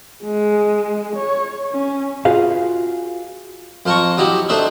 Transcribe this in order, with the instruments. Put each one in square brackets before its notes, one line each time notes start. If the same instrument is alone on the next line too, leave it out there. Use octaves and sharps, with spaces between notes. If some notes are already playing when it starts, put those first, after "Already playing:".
[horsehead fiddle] G#3
C#5
C#4
[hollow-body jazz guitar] F4 F#4 G#4 B4 F5
[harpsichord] F2 F4 A5 A#5 C#6
F#3 D#4 E4 G4
A3 D4 D#4 C5 D5 E5